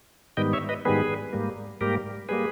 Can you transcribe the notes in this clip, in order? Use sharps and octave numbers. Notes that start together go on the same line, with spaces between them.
G#2 D#3 G3 B3 D#5 G5
C#5 E5
B4 D#5
G#2 D#3 G3 B3 G#4 B4
G#2 G3 A#3
G#2 G3 A#3 G4 A#4
G3 A#3 G#4 B4